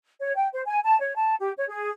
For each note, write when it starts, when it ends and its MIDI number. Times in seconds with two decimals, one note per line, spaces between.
0.21 0.34 73
0.36 0.47 79
0.53 0.61 72
0.66 0.79 80
0.84 0.99 81
1.00 1.13 73
1.16 1.35 81
1.40 1.51 67
1.57 1.64 73
1.69 1.89 68